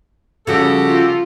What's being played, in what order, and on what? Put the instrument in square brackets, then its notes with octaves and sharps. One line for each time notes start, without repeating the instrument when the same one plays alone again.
[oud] C#3 F3 G3 [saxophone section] F#4 G4 A4
[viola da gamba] F4